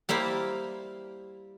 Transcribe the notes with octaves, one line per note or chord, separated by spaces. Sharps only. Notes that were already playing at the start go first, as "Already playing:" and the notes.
G3 A#3 E4 C5 F5